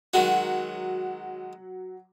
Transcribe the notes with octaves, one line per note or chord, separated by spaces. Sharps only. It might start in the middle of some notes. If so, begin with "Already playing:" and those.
D#3 F#3 G#3 F#4 F#5